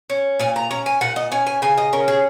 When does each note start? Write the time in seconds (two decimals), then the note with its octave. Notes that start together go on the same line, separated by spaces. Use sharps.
0.10 C#4
0.39 A#2 G#5
0.56 A#5
0.71 C#4 A#5
0.86 G#5
1.01 A#2 F#5
1.16 D#5
1.32 C#4 G#5
1.46 G#5
1.62 C#3 G#5
1.78 D#5
1.93 C#4 A#4
2.08 G#4